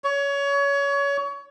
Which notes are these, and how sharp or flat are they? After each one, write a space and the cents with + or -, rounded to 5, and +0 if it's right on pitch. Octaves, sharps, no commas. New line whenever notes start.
C#5 +25